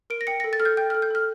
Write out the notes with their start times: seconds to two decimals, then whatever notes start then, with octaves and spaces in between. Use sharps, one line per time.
0.10 A#4 D7
0.21 A#6
0.27 G5 C#7
0.40 A4 A#6
0.53 A6
0.60 A4 F6
0.65 G6
0.77 G5 G6
0.90 A4 F6
1.02 G6
1.11 A4 F6